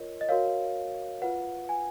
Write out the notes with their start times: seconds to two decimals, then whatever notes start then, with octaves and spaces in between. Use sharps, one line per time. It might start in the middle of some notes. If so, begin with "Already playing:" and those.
Already playing: F4 A#4 C#5 D#5
0.21 D#5
0.29 F#4 A#4 C#5 F5
1.22 F4 B4 F#5
1.69 G#5